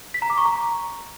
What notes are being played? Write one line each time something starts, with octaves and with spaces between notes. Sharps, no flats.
B6
A#5
D6
C#6
A#5